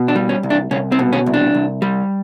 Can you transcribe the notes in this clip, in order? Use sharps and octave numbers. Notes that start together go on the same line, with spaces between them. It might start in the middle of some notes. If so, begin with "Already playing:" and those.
Already playing: B2
D4
G3
C#4
C2
D4
C2 C#4
C4
B2
C#4
C2
D4
C2
G3